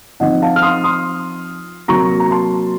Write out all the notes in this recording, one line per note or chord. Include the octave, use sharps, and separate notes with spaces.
F3 C4 D#4 D#5 F#5
F5 A5
F6
C6 D#6
C6 D#6
C3 F#3 A#3 A#5 C#6
A#5
A5 C6